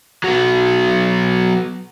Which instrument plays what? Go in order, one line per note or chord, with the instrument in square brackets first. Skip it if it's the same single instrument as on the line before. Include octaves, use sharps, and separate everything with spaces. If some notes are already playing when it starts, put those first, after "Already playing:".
[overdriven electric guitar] F#3 B3